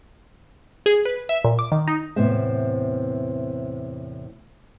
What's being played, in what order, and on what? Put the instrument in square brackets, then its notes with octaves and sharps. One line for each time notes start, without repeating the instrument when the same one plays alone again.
[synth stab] G#4
B4
E5
A#2
D6
D#3
D#4
[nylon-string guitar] E2 A2 C3 B3 C5 E5